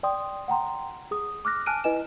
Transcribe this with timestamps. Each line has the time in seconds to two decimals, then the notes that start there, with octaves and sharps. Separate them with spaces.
0.03 D5 G5 C6 D#6
0.48 F#5 G5 A#5 C6
1.11 G#4 D#6
1.45 D6 F6 F#6 A#6
1.66 G#5 A5 F6 F#6 D7 D#7
1.84 E4 B4 D#5 G#5 E7